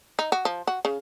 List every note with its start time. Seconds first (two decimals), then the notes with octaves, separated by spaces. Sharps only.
0.19 D#4
0.32 F#4
0.45 F3
0.67 F#4
0.85 C#3